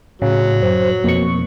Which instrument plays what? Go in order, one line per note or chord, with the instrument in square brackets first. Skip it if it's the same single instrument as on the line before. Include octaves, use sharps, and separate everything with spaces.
[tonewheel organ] A2 [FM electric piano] C#3 [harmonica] F#3
[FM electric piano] F#2 [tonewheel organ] C5
[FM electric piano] F2 B2 C#6 [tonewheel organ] A#3